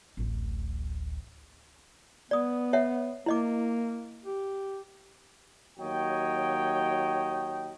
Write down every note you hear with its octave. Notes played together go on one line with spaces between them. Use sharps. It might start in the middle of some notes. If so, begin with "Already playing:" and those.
D1 A1
B3 D5 D#6
C#5 E5 F#5
A#3 E4 D#5 D6
G4
D#2 F#3 C#5 D#5 G5